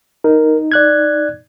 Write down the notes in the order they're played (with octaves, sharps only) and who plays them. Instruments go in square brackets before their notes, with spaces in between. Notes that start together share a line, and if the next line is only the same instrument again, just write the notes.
[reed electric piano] D#4 [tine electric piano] A#4
[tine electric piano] D5 F#6 G#6